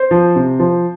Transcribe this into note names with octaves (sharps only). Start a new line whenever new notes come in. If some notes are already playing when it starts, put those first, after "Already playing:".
Already playing: C5
F3
C3
F3